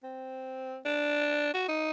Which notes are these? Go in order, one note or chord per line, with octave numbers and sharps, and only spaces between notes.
C4
D4
F#4
D#4